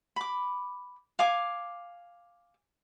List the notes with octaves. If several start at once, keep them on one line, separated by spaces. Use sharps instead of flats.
B5 D6
F5 G#5 D6